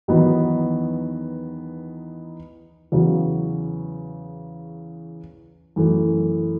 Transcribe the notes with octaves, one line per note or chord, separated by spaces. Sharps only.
E2 D#3 F#3 B3 D#4
E2 C#3 F#3
F#2 E3 A3